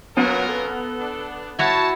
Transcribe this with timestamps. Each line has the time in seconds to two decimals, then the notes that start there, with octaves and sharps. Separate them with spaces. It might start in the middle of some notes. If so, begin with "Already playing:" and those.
0.17 F#3 B3 C#4 F4 A#4
0.49 A4
1.00 D4
1.59 E4 F#4 C#5 A5